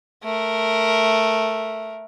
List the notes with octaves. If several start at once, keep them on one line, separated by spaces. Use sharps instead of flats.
A3 A#4